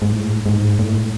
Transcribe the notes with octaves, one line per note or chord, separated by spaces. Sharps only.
G#2
A2
G#2
A2